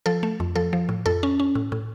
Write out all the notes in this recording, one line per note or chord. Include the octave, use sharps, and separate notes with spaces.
F3 A4
A3
F2
F3 A4
F3
A2
F2 A4
C#4
C#4
A2
A2